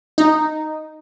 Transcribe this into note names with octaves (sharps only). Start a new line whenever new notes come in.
D#4